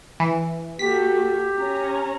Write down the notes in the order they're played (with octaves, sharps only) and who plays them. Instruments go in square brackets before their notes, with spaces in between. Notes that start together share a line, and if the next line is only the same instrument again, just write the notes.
[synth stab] E3
[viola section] A#3 F#4 A4 [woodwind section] G4 [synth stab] B6
[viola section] C#4 A#5